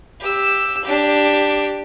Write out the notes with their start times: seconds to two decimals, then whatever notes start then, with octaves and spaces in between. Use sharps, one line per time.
0.21 G4 E6
0.84 D4 G4